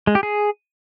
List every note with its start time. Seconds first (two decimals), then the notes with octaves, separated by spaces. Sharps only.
0.07 G#3
0.15 G4
0.23 G#4